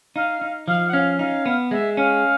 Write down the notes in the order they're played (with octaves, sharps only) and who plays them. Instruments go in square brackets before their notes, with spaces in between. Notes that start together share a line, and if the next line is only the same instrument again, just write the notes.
[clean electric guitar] D#4 [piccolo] F5
[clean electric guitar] D#4
[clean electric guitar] F3 [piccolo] F5
[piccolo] F#5
[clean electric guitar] C#4 [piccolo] F5
[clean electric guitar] D#4 [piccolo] F5
[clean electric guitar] B3
[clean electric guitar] G#3 [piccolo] E5
[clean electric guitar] C#4 [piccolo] F5